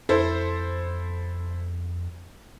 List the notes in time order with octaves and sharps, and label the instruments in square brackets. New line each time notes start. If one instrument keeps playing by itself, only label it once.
[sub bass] F2 [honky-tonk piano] E4 A4 C5